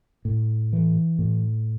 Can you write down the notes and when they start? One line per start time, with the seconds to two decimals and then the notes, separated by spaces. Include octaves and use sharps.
0.25 A2
0.73 E3
1.19 A2